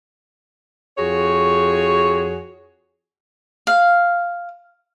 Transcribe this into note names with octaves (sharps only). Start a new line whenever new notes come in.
F2 F#4 G#4 C#5
F5